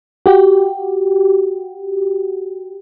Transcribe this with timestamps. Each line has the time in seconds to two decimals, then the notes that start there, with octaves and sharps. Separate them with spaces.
0.26 F#4 G4